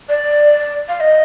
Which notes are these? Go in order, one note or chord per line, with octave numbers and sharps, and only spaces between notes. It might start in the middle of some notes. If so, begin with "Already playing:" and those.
D5
F5
D#5